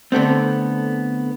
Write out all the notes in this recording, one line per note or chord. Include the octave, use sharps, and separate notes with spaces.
D3 A3 B3 C4